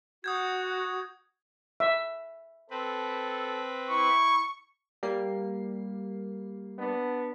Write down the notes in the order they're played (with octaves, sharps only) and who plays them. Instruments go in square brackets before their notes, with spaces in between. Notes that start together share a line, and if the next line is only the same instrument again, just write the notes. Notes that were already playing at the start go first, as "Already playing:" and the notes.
[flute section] F#4 [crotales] D#6 G6 G#6
[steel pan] E5
[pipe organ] C4 B4 [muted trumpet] A4
[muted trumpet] E4 [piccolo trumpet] C#6
[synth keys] G3 A#3 C7
[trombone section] B3 D4